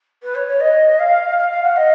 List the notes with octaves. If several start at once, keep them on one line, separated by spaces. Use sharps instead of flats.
B4
C#5
C#5
D#5
F5
F5
F5
F#5
D#5